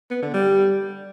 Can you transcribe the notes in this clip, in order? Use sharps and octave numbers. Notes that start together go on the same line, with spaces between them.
B3
D3
G3